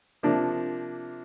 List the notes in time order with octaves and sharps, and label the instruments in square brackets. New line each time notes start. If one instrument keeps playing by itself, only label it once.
[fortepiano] C3 F3 A#3 D4